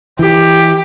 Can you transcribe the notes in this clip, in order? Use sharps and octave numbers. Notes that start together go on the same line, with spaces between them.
E3 G4